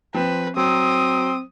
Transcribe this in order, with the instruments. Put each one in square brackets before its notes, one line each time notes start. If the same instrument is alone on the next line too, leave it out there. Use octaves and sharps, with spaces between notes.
[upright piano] F3 C4 [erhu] B4
[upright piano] F#3 [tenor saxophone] C4 [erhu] D#6